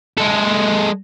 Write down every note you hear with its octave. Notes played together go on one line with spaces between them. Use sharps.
G#3 A4